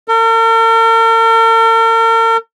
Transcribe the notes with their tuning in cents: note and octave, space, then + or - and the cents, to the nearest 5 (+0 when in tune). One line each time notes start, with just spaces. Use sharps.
A#4 -45